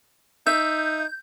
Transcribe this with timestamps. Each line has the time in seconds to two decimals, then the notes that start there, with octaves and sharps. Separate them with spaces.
0.47 D#4 E5 G6